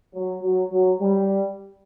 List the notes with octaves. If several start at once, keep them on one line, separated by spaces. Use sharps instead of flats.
F#3
F#3
F#3
G3